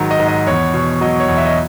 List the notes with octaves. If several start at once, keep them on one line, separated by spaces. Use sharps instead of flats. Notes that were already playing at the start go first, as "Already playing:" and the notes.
Already playing: G#2 D#3 F#3 D#5
D#5
G#2
D#5
E2 C#5
B2
F#3 D#5
C#5
E2
E5
D#5